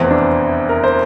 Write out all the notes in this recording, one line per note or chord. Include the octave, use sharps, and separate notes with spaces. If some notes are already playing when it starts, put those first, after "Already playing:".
Already playing: F1 E2 E3 C4
D4
A#4
C5